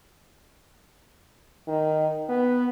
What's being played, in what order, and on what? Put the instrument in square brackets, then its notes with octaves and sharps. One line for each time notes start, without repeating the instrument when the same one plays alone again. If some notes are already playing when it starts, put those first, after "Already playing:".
[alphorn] D#3
B3